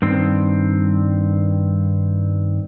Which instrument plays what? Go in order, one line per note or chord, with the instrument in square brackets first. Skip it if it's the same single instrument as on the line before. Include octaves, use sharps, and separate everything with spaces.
[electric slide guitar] G2 D#3 C4